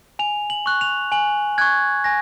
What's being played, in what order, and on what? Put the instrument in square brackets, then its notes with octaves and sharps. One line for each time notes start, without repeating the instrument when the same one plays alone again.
[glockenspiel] G#5 F7
F#7
C#6 F#6
F7
G#5 F#7
C#6 F#6 G#6
G#5 A#6